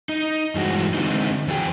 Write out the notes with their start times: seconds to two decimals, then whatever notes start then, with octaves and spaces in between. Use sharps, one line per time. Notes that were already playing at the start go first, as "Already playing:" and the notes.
0.09 D#4
0.55 G2 E3 G#3 F#4
0.94 D3 G#3 C4 D#4
1.48 E2 F#3 G#4 G5